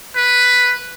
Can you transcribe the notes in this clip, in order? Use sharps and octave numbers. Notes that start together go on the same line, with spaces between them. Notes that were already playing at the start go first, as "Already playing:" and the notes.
B4